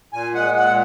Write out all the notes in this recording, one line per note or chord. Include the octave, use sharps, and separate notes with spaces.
A#2 G#5
G#3 F#5
A#2 F#5